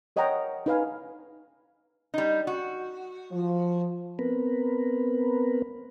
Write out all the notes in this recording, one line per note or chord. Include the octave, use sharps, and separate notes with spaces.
A#4 C#5 D#5 F#5 G5 A#5
D#4 B4 F5 G#5
G3 D#4
F#4
F3
B3 C4 A#4 B4